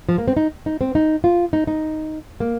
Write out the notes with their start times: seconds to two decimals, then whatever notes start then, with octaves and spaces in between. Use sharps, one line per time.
0.09 F3
0.18 A#3
0.28 C4
0.37 D#4
0.66 D#4
0.81 C4
0.95 D#4
1.24 F4
1.53 D#4
1.67 D#4
2.40 A#3